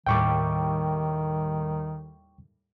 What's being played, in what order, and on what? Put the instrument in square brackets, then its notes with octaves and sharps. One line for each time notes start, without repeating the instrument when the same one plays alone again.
[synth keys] D#2 A2 G3 [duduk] D#3 [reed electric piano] G5 C#6 D6